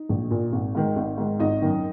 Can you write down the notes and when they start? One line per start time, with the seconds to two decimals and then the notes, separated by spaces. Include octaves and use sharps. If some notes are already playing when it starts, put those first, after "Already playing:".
Already playing: D#4
0.09 A#1
0.31 A#2
0.53 G#1
0.75 G#2 D#3
0.96 G#1
1.18 G#2 D#3
1.39 G#1 D#4 D#5
1.62 F#2 D#3